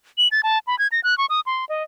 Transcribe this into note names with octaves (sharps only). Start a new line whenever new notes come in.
F#7
A6
A5
B5
G#6
A#6
F#6
C#6
D#6
C6
D#5